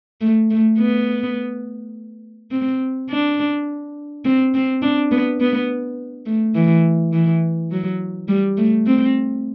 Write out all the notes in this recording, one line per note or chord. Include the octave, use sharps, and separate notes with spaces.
A3
A3
B3
C4
D4
C4
C4
D4
B3
B3
A3
E3
E3
F#3
G3
A3
C4